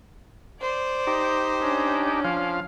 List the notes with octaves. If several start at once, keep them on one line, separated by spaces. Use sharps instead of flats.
C5 D5
D#4 G4
C#4 D4
F3 F5